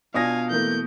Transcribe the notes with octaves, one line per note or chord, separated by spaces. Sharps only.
B2 D4 F4 F5 G#5 D#6 A#6
E3 A3 A#3 G6